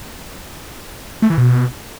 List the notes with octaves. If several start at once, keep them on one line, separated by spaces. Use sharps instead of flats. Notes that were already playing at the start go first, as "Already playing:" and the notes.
A3
E3
B2